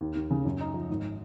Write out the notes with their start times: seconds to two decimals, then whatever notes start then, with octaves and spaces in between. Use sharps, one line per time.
0.01 D#2
0.15 D#2
0.31 C#3
0.45 F#2
0.61 D#4
0.74 F3
0.90 G#1